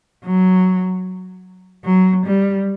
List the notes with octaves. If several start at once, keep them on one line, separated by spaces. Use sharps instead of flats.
F#3
F#3
G3